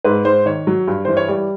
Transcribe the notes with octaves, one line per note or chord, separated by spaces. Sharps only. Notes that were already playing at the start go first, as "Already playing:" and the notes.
G#2 B4
G#2 C5
D#3 C#5
F#3
G2
E3 C5
C#5
G3 D5